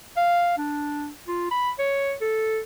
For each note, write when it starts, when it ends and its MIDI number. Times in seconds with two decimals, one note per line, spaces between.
0.17 0.55 77
0.58 1.10 62
1.28 1.51 65
1.51 1.71 83
1.79 2.14 73
2.21 2.61 69